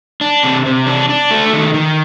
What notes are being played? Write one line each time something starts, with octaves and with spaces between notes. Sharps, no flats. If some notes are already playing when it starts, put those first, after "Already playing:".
D4
C3
C3
D4
D4
A3
D#3
D#3